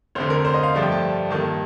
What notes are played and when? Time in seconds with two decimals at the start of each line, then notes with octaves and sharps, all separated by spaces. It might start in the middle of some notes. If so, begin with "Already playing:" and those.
0.15 F1 F2 D3 C5
0.30 A#4
0.45 C5
0.54 D#5
0.63 F5
0.73 G2 F3 A3 D4
0.83 G5
0.92 A5
1.31 G2 D#3 A#3 A5